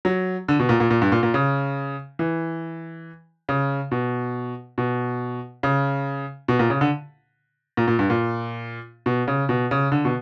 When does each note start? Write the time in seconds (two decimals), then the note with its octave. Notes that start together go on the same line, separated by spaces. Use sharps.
0.05 F#3
0.48 D3
0.60 B2
0.69 A#2
0.80 A#2
0.91 A#2
1.02 G2
1.12 A#2
1.23 A#2
1.34 C#3
2.19 E3
3.49 C#3
3.91 B2
4.78 B2
5.63 C#3
6.48 B2
6.59 A#2
6.70 C#3
6.81 D3
7.77 A#2
7.88 A#2
7.99 G2
8.10 A#2
9.06 B2
9.28 C#3
9.49 B2
9.71 C#3
9.92 D3
10.05 B2